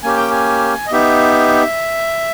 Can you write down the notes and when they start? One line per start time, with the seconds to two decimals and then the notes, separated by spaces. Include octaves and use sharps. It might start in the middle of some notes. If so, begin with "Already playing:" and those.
0.03 A#3 C#4 G4 G#5
0.17 G5
0.31 G#5
0.87 D#5
0.92 B3 D#4 G4 E5